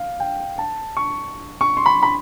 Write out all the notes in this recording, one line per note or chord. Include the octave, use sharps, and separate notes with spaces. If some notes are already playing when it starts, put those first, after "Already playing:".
Already playing: F5
G5
A5
C#6
C#6
C6
B5
B5